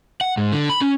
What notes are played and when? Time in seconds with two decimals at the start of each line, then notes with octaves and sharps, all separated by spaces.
0.21 F#5
0.37 G#2
0.52 D3
0.69 B5
0.81 C#4